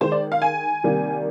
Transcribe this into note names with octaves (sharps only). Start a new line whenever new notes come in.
D#3 G#3 C5
D5
F5
G#5
C3 D#3 G3 A#3